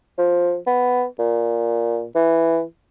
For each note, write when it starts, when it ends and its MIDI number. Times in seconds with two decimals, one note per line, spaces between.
0.18 0.57 53
0.67 1.05 59
1.19 2.05 46
2.15 2.62 52